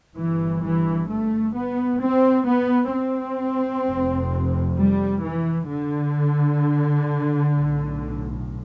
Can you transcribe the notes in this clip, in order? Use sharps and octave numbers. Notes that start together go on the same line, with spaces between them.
G1 G2 E3
E3
A3
B3
C4
B3
C4
F1 F2 C3
G3
E3
D3
B1 A2